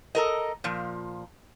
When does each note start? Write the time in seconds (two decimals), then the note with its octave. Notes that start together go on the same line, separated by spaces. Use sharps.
0.15 A4 A#4 D#5
0.64 A#2 F3